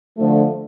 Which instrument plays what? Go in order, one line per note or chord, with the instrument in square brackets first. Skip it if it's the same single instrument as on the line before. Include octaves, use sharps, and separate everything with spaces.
[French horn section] D3 F3 A3